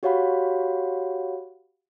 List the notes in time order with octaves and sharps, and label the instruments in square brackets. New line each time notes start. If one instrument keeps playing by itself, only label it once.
[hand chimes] F#4 G4 C#5 F5 F#5 B5